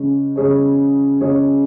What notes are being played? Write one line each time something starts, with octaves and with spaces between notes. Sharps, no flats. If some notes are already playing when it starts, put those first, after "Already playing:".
Already playing: C#3 G#3 C#4
C#3 G#3 C#4 G#4 C#5
C#3 G#3 C#4 G#4 C#5